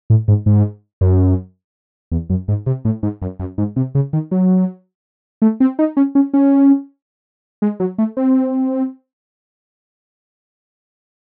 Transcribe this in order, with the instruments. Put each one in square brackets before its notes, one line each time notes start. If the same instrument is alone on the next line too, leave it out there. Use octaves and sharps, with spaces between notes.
[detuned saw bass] A2
G#2
G#2
F#2
E2
F#2
G#2
C3
A2
G#2
F#2
F#2
G#2
C3
C#3
D#3
F#3
A3
C4
D#4
C#4
C#4
C#4
G#3
F#3
A3
C4